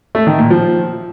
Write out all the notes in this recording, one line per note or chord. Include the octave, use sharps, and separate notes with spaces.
A3
D#3
A#2
F3